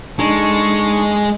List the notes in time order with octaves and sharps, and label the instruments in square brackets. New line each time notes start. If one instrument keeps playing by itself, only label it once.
[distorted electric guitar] G#3 [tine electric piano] D4 D#4 [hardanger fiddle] A4 C#6